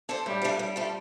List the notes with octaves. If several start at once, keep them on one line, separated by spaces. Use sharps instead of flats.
D4 A4 C5
A2 G3
F3 A3 D4
A2 G3
F3 A3 D4